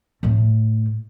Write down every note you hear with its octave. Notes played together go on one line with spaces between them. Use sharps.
A2 A3